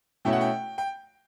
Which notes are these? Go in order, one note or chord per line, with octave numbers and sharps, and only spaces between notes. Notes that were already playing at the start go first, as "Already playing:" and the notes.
B2 A3 C#4 E4 G5
F#5
G5
G5